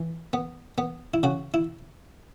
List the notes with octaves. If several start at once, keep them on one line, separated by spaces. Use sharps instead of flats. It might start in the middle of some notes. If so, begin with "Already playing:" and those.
Already playing: E3
B3
B3
E4
C#3 F#4
E4